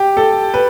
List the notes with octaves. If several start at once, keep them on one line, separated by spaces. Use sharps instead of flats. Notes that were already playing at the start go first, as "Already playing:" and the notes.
Already playing: G4
A4
B4